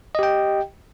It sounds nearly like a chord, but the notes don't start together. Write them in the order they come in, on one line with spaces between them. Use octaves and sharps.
D#5 G4 G5